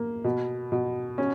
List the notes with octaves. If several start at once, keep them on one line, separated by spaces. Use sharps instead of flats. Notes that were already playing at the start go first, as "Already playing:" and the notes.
Already playing: A#3
B2
B2
C#4